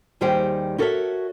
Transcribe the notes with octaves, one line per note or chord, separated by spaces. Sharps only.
D#2 D#3 G3 G#4 C5 G5
E4 F#4 A4 A#4 C#5 E5